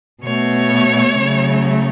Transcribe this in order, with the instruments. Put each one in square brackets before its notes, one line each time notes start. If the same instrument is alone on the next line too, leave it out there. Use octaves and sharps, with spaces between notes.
[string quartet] B2 A3 C#5
C#3 F#3 A3